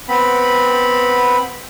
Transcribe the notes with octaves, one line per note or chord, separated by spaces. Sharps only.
B3 C4 B5